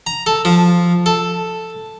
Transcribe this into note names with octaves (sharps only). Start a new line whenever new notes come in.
A#5
A4
F3
A4